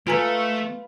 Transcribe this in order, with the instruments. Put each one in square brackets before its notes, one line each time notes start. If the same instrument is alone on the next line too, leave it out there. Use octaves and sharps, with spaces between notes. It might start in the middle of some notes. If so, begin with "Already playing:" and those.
[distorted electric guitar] A3 [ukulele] F4 B4 [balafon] F5 G#5 A#5